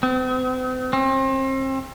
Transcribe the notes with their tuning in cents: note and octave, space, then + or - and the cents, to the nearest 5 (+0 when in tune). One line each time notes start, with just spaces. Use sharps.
C4 -40
C4 +35